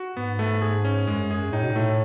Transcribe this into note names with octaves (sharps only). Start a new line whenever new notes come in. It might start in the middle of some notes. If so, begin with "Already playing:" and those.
Already playing: F#4
G#2 B3
A3
G#4
C#4
F#2 G#3
F#2 G#4
A2 D#4
B2
A2 A3